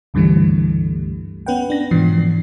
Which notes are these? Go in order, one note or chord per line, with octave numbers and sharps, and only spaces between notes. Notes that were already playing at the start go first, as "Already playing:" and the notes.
C#2 G2 D3 E3 G3 A3
B3 C#4 B4 F#5 G5
D4 A#6
G#2 B2 E3 F3 C7